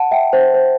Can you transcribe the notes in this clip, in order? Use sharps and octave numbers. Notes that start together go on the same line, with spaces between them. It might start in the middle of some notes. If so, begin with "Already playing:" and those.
Already playing: F#5 A5
E5 G5
C5
C5